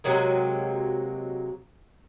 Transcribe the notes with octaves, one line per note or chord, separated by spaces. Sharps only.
C3 F#3 G#3 A#3